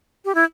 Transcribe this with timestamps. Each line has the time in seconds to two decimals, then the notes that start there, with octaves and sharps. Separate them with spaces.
0.25 G4
0.35 E4